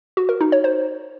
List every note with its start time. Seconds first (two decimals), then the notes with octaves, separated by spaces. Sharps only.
0.17 F#4
0.29 A#4
0.41 D#4
0.52 C#5
0.64 C5